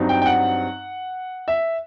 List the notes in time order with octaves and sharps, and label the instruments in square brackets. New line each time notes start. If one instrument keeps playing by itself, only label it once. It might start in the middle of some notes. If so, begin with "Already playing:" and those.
Already playing: [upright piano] G2 F#3 C4 D#4
G5
G5
F#5
E5